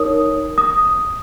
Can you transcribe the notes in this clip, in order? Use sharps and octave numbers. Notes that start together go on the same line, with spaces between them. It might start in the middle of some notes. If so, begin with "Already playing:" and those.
Already playing: D#4 A#4 C#5 D#6
D#6